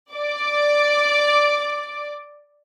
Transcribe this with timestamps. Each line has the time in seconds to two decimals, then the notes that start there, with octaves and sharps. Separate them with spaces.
0.14 D5 D6